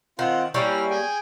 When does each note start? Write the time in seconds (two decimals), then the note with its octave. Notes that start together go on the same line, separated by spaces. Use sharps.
0.19 D#3 C4 F4 F#5
0.54 G3 A#3 C#4 E4 F6
0.91 G#4 G5 G#5